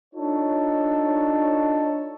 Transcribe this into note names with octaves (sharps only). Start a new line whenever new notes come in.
D4 D#4 F4 A4 C#5